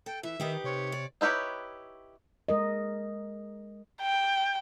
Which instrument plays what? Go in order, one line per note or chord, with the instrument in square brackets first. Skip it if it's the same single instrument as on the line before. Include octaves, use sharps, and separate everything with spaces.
[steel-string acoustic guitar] A4 [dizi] G5
[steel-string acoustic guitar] E3 [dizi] E5
[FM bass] D#3 [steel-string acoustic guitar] D#4 G4 B4
[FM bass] C3 [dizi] C#5
[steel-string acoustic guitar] D5
[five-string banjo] D#4 E4 G4 B4 C#5
[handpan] G#3 A#4 D#5
[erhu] G5